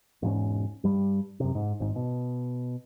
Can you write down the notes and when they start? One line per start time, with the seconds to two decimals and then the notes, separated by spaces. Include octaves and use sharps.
0.22 E1 G#2 C#4
0.84 G2 G3
1.40 F#2 C3
1.55 G#2
1.80 G#1 G#2
1.96 B2